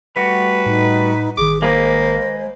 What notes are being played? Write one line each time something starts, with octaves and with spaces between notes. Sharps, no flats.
G3 A3 F#4 B4
A2 D#4
A1 D#3 G#4 D6
G#3 A#3 B4 C5 D#5